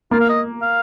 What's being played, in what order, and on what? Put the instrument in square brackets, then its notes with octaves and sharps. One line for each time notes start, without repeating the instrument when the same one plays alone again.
[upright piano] A#3 [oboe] F4
[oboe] F5
D#5
F5